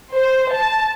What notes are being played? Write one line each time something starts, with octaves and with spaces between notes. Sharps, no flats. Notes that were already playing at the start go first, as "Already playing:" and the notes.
C5
A5